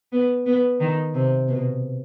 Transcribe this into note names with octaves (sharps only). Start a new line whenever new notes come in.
B3
B3
D#3
C3
B2